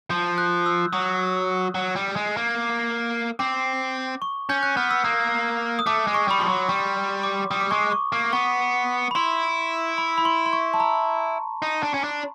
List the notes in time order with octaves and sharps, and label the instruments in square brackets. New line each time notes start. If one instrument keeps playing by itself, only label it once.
[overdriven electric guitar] F3 [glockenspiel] G6
[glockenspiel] F#6
E6
[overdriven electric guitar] F#3 [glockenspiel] D#6
[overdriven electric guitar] F#3
G3
G#3
A#3
[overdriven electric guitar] C4 [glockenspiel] D6
[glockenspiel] C#6
[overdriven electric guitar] C#4 [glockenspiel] G6
[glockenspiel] F#6
[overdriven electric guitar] B3 [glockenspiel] F6
[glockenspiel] E6
[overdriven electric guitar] A#3 [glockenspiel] D#6
[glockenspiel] D#6
[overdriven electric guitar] A3 [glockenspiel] D6
[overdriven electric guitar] G#3
[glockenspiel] C#6
[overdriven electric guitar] G3 [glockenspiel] B5
[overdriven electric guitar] F3 [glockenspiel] C6
[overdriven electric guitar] F#3
[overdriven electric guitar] G3 [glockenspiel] C#6
[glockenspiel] D6
[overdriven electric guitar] G3 [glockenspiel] D#6
[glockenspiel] D6
[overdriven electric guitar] G#3 [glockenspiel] C#6
[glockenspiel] D6
C#6
[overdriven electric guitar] A#3
[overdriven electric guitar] B3 [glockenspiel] C#6
[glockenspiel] B5
[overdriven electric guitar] E4 [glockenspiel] C6
[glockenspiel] B5
B5
C6
C6
C#6
A5
A#5
[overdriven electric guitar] D#4
D4
C#4
D4